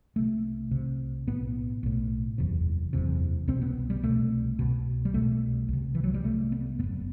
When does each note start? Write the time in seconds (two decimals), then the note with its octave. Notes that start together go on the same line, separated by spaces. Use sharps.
0.16 C2 C3 A3
0.71 C2 C3
1.27 B1 A2 B3
1.83 B1 A2
2.38 F#1 E2 C3
2.93 F#1 E2 C3
3.48 C2 B2 C4
3.62 B3
3.90 G3
4.03 C2 B2 A3
4.59 C2 B2
5.05 G3
5.14 C2 B2 A3
5.68 C2 C3
5.95 E3
6.04 F#3
6.14 G3
6.24 C2 C3 A3
6.52 B3
6.79 F#1 F#2 B3